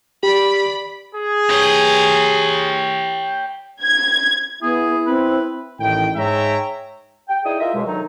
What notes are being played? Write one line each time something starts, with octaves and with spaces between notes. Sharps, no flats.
G4 D5 B5
G#4
G4 C#5
G#6
B3 E4 G#4
C4 B4
A1 A2 D#3 G5
G#2 G#3 C#5 E5 G5 A#5
G5
D#4 E4 G#4 D5 G5 D#6
F4 A#4 D#5 E5
C#2 F#2 B2 G#3
D3 D#3 F#3 D#4